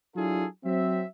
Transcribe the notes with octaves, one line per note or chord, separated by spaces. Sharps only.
F#3 D4 E4 F4 G#4 A4
F#3 C4 E5